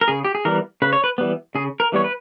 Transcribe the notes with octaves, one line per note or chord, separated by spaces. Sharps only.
A#4
C#3 G#4
G4
G#4
E3 G3 B3 A#4
C#3 B4
C#5
B4
E3 G3 B3
C#3 G#4
A#4
E3 G3 B3 C#5
B4